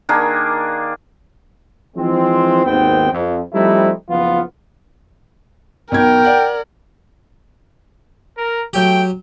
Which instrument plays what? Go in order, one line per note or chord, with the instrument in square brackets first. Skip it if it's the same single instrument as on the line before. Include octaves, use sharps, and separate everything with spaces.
[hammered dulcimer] D#3 A#3 D4 G#4
[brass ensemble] E3 F3 G#3 C4
G#1 D#2 B3 C4 G5
F2
F3 G3 A3 C4 D#4 E4
F#1 F3 B3 F4
[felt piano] B1 B2 G#6 [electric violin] A#4 [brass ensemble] G5
[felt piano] D5 F#5
[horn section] A#4
[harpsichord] F#3 G4 [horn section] A3 G5